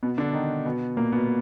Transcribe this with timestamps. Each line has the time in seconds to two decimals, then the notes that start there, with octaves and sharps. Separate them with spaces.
0.03 B2 B3
0.18 D3 D4
0.33 D#3 D#4
0.65 B2 B3
0.97 A#2 A#3
1.12 B2 B3